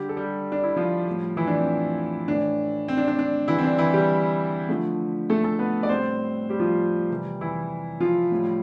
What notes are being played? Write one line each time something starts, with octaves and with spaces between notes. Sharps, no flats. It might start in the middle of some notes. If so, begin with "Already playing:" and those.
Already playing: D3 G3 G4
A4
G3 G4
D4
E4
F3 F4
A2 G3
E3 E4
D4
C4
A2 E3 A3 D4
C4
D4
D4
D4
D3 E3 G3 E4
C4
D4
E3 E4
G3 G4
D3 F3 A3
A3 A4
A3 A4
B3 B4
D5
A2 G3 C4 C5
G3 G4
F3 F4
C3 E3 G3
E3 E4
F3 F4
A2 G3